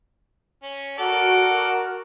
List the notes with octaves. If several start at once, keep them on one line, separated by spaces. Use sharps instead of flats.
C#4
F#4 A4 A#4 D5 F#5